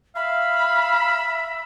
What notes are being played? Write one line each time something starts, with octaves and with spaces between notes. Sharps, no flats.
E5 F5 B5